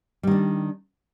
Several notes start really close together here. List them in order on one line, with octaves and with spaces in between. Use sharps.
G3 D#3 D4